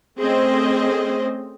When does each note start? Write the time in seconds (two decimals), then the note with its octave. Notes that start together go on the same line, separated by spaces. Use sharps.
0.19 A3 C4 C#4 G#4 C5 D#5